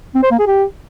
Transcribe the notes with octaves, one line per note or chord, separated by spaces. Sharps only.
C4
C5
A#3
G#4
G4